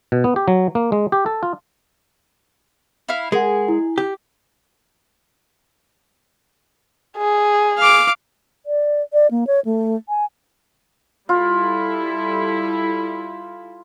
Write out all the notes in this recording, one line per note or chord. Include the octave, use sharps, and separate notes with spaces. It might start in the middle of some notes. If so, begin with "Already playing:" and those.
B2
B3
G4
F#3
A#3
G#3
G4
A4
F4
E4 F5
G#3 G#4 A#4 F#5
E4
G4
G#4
F5 D6
D5
D5
A#3
C#5
A3
G#5
G3 E4 F4 A4